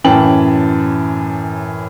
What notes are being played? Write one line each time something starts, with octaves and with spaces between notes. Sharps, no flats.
F#2 A2 E3 G5 A5 F#7